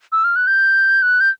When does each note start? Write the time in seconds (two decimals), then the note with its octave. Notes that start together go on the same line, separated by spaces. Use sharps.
0.12 E6
0.24 F6
0.36 F#6
0.47 G6
1.02 F#6
1.20 G6